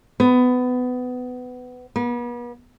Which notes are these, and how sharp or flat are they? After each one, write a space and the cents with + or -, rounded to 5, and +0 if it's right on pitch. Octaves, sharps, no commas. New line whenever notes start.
B3 +20
B3 -40